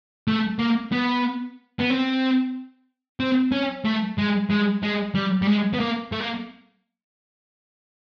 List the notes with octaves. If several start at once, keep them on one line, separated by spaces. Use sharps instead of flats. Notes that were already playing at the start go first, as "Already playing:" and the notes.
A3
A#3
B3
B3
C4
C4
C#4
A3
G#3
G#3
G#3
G3
G3
G#3
B3
A#3
A3
A#3